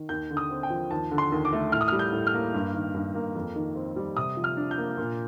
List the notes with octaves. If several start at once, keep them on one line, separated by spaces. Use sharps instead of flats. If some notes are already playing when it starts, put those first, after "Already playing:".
Already playing: D#3
D#2 G6
D3
D#6
C4
G5
F3
D#2 A5
D3
C6
D#2
D6
A3
A2 F6
D#6
G3 F6
G6
A2
F6
A#3
G2
D#3
G2
A#3
F2
D#3
C4
G3
C3 D#6
F3
F6
D4
G6
A#3
A#2